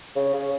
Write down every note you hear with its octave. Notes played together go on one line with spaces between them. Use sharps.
C#3
C#3